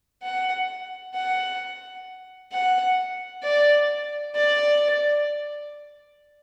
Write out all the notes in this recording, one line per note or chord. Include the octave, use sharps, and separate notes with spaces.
F#5
F#5
F#5
D5
D5